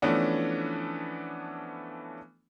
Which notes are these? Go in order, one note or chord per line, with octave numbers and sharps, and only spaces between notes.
E3 F3 A3 B3 C#4 D4